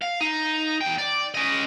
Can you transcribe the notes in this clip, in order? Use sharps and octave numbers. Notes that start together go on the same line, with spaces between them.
F5
D#4
E2 G5
D5
C#4 D#5